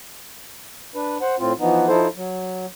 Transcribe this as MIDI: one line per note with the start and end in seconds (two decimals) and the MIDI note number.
0.95 1.18 62
0.95 1.18 71
1.21 1.35 72
1.21 1.35 78
1.39 1.53 45
1.39 1.53 60
1.39 1.53 65
1.60 1.88 52
1.60 1.88 53
1.60 1.88 59
1.60 1.88 63
1.88 2.07 53
1.88 2.07 63
1.88 2.07 64
1.88 2.07 69
1.88 2.07 72
2.16 2.66 54